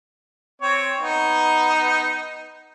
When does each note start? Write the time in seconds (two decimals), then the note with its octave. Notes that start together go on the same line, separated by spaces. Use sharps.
0.62 C4 C#5
1.00 B3 D#4